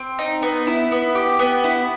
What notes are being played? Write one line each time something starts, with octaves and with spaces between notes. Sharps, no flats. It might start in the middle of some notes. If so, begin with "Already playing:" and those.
Already playing: C4
D#4
B3
E4
B3
G4
B3
E4